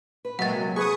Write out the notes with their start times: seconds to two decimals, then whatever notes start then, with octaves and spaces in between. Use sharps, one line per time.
0.25 B4
0.39 C3 F#3 G#3 A#3 F#5 A6
0.76 G#4 B4 C#6 D#6